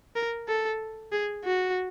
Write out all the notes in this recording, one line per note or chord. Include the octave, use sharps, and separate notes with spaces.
A#4
A4
G#4
F#4